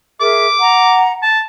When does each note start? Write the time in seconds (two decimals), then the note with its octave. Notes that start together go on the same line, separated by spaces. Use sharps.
0.20 G#4 A#4 E5 D6
0.59 F#5 A#5
1.22 A5